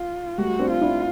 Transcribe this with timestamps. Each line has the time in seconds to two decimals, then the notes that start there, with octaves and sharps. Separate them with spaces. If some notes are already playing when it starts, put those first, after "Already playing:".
Already playing: F4
0.38 G3 A3 F#4
0.59 C4 D4
0.71 F4
0.81 D4 E4